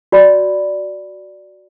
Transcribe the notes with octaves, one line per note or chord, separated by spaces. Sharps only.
F#4 D5 B5